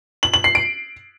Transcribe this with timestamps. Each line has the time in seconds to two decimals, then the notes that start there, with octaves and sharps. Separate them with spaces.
0.23 F#7
0.34 F#7
0.44 C7
0.55 D7